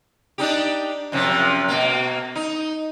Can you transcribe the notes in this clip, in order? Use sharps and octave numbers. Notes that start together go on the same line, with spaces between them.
D4 D#4 G4
F#2 C3 F3
B2 A#3
D#4